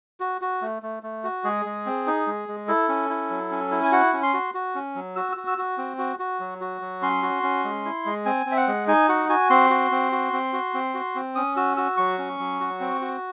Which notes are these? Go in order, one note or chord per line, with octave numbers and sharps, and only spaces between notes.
F#4
F#4
A3
A3
A3
F#4
G#3 G#4
G#3
C4
D#4
G#3
G#3
E4 A4
C#4
E4
F#3
C#4
E4
G#5
F#4 F#5
C#4
C6
F#4
F#4
C#4
F#3
F#4 E6
F#4 E6
E6
F#4
C4
F#4
F#4
F#3
F#4
F#3
C#4 C6
F#4
C#4
G#3
E4
G#3
C4 G#5
C4
E5
F#5
G#3
D#4 G#5
F#4 F#5
F#4 G#5
C4 C6
F#4
C4
F#4
C4
F#4
C4
F#4
C4
C#4 D#6
F#4 E6
F#4 E6
F#3 C#6
C#4
F#3
F#4
C4
F#4